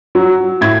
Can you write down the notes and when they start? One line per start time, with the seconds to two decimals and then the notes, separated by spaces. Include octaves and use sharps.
0.15 F#3
0.61 A2 G#6